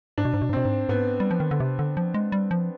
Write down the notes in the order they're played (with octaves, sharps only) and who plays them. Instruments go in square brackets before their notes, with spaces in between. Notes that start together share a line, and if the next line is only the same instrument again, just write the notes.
[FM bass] G#2 [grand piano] D4
[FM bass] B2
G#2
B2
G#2
[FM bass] B2 [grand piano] C4
[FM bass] G#2
[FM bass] G#2 [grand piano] B3
[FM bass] G3
F3
D#3
D3
C3
D3
F3
G#3
G3
F3